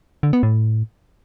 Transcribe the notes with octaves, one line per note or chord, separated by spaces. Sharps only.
D3
B3
A2